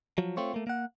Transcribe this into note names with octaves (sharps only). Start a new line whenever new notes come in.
F3 F#3
A3 C4 F4 C#5
A3 A#3
A#3 F#5